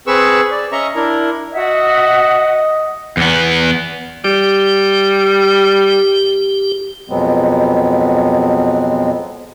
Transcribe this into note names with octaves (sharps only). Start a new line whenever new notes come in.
C4 G#4 B4 C#6 E6
D5
C#4 D#5 E5 A#5 C#6
D4 E4 A#4
F#4 D#5 E5 F#5
E2 B3
G3 G4
F2 B2 F#3 G#3 B3 C4